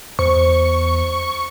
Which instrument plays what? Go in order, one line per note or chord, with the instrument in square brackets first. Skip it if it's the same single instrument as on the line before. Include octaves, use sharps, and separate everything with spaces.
[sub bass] E2 [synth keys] C5 [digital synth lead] C#6